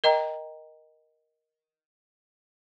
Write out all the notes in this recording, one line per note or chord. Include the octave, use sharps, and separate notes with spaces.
A#4 D#5 G5 A#5